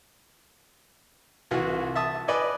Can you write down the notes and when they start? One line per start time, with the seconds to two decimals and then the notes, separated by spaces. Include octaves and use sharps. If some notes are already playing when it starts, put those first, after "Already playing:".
1.51 C2 E3 F4 F#4
1.95 E5 A5 D#6
2.28 B4 D5 D#5 G#5